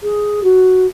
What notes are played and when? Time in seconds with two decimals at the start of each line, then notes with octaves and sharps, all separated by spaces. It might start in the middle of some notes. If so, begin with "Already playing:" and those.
0.03 G#4
0.43 F#4